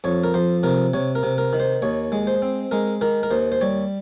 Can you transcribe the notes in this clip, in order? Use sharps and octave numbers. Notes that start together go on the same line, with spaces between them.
F2 C#5
A#4
F2 C5
C3 A#4
C3 C#5
A#4
C3
A#4
D#3
C5
D#2 C#5
G#3
C5
C4
G#3 A#4
D#3 A#4
A#4
D#2 C5
C5
G3 C#5